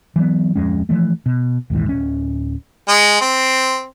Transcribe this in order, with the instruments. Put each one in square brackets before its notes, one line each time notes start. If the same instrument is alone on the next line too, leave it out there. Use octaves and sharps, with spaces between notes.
[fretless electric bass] E3 F#3 B3
D1 F2 G#3 C#4
E3 F3 G#3 A3
B2
A#1 D#2 G#2 E3
D1 C#4
[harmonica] G#3
C4